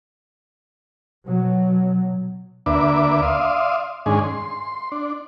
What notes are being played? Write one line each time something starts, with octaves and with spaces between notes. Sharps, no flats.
B2 F#3
D2 A#3 D4 B4 E5 D6
D5 E5 F5 C6 D#6
G#2 D#3 G#3 C#4 D4 G#4
C6
D4